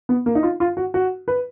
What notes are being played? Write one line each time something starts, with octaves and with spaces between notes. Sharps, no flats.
B3
A#3
D#4
F4
F4
F#4
F#4
B4